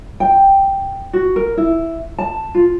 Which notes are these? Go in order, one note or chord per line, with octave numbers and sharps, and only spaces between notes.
G5
F#4
A#4
E4
A5
F4